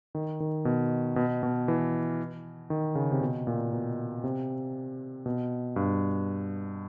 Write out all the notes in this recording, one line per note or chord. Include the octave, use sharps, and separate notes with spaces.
D#3
D#3
B2
B2
B2
E3
D#3
C#3
C3
B2
A#2
B2
C3
B2
G2